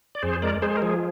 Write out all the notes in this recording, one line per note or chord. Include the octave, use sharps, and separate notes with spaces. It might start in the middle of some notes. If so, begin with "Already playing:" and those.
D5
F2 G#4 C5
G#3 A#4 D5
G#3 G#4 C5
A#4
F3 G#4